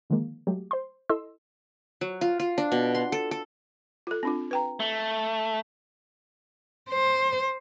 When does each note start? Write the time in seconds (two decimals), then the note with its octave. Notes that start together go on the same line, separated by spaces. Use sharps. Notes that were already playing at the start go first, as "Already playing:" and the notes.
0.10 D3 D#3 F3 G#3 A#3
0.47 F#3 G#3 A3 G4
0.71 C5 C6
1.09 E4 A4 D#5 C6 E6
2.01 F#3
2.21 F4
2.40 F4
2.58 D4
2.72 B2
2.95 C6
3.12 A4
3.31 A4
4.07 F4 A4
4.23 C4 D4 F4
4.51 B4 G5 A#5
4.80 A3
6.90 C5